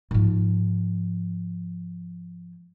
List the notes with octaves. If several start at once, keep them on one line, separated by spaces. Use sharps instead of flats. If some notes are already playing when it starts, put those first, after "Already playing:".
G#2 F3